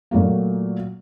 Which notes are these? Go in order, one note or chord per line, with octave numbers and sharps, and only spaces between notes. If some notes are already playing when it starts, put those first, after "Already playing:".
A#2 F#3 A3 A#3